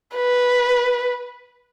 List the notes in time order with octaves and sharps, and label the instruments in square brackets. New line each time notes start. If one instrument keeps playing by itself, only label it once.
[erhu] B4